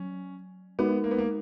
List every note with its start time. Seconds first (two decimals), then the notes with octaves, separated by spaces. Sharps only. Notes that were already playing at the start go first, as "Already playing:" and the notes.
Already playing: F#3 C#4
0.79 G#3 B3 D#4 F#4 A#4
1.04 A#3
1.11 B3
1.18 A#3